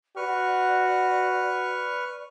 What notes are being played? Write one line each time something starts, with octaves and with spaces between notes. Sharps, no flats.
F#4 B4 D5 C#6 F6